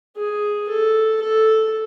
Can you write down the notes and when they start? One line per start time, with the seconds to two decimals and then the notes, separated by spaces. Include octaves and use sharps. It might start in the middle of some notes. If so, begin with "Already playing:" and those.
0.16 G#4
0.69 A4
1.22 A4